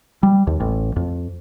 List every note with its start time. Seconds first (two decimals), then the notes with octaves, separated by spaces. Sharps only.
0.23 G3
0.47 D#2
0.60 A1
0.96 F2